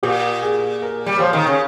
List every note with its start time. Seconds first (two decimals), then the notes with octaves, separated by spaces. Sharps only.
0.03 A#2 G4
0.43 G#4
0.82 A#4
1.06 G3
1.16 C#5
1.19 F3 C5
1.33 D#3
1.47 C#3